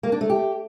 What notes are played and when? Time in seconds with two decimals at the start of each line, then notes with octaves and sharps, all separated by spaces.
0.03 A#3
0.12 D4
0.21 A3
0.30 G4